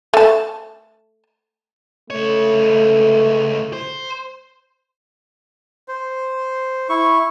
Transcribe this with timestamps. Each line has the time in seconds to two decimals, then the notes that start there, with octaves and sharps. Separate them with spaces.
0.14 A3 A5
2.10 C#2 A3 C#5
3.73 C5
5.88 C5
6.89 E4 C#6